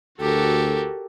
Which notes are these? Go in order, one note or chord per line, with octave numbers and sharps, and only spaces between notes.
D2 F#4 G4 A4 A#4